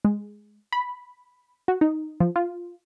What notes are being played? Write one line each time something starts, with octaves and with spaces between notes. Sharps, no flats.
G#3
B5
F#4
D#4
F3
F4